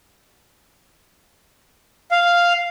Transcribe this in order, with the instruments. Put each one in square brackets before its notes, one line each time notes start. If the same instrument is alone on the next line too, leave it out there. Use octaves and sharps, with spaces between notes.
[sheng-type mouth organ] F5